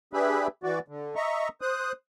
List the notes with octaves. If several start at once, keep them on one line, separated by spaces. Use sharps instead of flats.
D4 G4 G#4 B4 E5 B5
E3 F#4 D5
D3
D#5 E5 A#5 C#6
C5 D#6 F#6